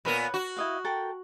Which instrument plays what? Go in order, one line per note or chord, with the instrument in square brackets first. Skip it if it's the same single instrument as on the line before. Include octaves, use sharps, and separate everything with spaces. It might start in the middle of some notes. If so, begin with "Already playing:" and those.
[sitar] A#2 B3 A#4 [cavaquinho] B4 C#5
[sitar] F#4
[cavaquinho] E4 D#5 F5
A4 A#4 G5